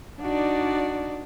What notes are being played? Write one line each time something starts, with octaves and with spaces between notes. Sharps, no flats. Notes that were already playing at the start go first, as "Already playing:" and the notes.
D4 D#4 F#4 D5